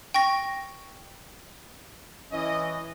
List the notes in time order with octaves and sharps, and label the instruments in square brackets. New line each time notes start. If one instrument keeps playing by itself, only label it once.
[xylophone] G5 C#6 A#6
[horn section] E3 C#4 D#5